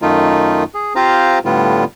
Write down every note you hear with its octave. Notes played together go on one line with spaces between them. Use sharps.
F#2 D#3 A3 D#4 F4
G#4
C4 F4 G4 C5 F5 A#5
A2 D3 G3 B3 F4